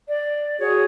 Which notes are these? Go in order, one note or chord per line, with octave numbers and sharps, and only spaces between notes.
D5
F#4 G#4 C#5